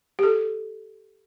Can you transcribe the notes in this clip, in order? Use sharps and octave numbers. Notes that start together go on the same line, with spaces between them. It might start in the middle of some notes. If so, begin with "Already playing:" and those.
G4 A4